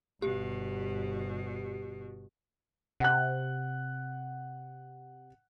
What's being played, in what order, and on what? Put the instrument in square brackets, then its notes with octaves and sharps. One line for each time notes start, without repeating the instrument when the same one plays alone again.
[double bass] G1 [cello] B2 [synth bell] G4
[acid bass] C3 [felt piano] F#5 F#6